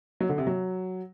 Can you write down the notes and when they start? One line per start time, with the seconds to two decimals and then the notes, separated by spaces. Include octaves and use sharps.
0.20 F#3
0.29 D3
0.38 C3
0.47 F#3